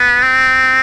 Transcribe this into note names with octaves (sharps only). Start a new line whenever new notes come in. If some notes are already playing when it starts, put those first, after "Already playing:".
Already playing: B3
C4